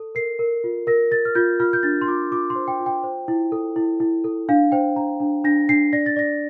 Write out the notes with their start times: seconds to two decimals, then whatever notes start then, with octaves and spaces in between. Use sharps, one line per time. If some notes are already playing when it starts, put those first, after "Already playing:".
Already playing: A4
0.15 A#4 C7
0.39 A#4
0.64 F4
0.87 A#4 A#6
1.11 A#4 A6
1.25 F6
1.35 F4 G6
1.60 F4 F6
1.73 G6
1.83 D4 A6
2.01 C6
2.08 F4 D6
2.31 F4 D6
2.50 C6
2.56 C5
2.68 G5
2.80 F4
2.86 G5
3.03 C5
3.28 E4
3.52 A4
3.76 E4
4.00 E4
4.24 A4
4.49 D4 F5
4.72 C5 G5
4.96 D4 A#5
5.20 D4
5.44 D4 A#6
5.69 D4 C7
5.93 D5 A#6
6.06 A6
6.16 D5 A#6